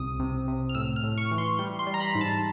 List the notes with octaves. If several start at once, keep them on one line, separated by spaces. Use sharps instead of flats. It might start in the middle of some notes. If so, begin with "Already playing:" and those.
Already playing: C2 C3 D#6
C3
C3
F6
A2 E6
F6
A2
C#6
E3
C6
G3 C6
C6
G3
A#5
B5
G#2
A5